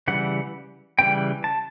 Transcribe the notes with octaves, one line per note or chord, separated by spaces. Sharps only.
C#3 E3 G3 F#5
C#3 E3 G3 G5
A5